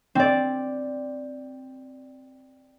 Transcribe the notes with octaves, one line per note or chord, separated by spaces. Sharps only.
C4 D5